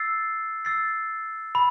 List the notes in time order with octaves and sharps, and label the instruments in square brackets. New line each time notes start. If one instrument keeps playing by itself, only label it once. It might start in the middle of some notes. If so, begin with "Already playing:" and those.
Already playing: [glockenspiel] E6 A6 C7
E6 A6 C7
B5